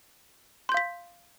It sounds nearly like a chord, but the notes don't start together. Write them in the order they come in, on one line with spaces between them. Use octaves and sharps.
C6 G6 F5 B6